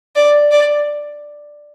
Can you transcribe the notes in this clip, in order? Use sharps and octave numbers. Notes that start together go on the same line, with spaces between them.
D5
D5